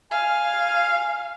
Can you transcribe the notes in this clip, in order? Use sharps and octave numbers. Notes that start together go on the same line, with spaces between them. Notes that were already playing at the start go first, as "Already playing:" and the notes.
F5 G#5